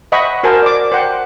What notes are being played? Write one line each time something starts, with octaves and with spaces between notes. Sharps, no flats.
C5 D#5 E5 F#5 B5 C#6
F#4 A#4 C5 G#5 A5
D5 D6
C5 F#5 G5